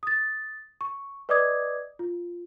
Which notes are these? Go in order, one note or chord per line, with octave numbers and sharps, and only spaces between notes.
D#6 A6
C#6
B4 D5 D#5 D6 D#6 G#6
F4